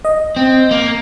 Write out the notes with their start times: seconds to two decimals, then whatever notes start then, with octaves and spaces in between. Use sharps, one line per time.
0.05 D#5
0.36 C4
0.71 A#3